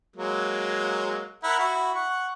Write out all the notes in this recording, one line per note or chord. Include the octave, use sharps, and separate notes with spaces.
F#3 G#3 A#3
E4 A#4 F#5
E4 F#4
F#5 C#6